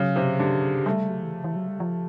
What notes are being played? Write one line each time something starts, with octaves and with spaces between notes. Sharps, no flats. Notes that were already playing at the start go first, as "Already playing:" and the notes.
Already playing: C#3 F#3
C3
D3
G3 A3
F#3
E3
F3
E3
F#3
G3
F3